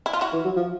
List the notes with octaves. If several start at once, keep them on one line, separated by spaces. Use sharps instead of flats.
E4
F4
E4 F#4
E3
F#3
F3